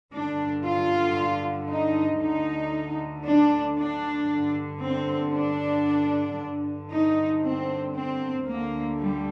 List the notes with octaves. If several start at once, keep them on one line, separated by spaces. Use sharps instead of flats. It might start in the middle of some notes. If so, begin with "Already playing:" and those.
G2 D3 D4
F4
D#4
D2 D3 D#4
D4
D4
G2 D3
C4
D4
G2 D3
D#4
C4
C4
D2 D3 A#3
G3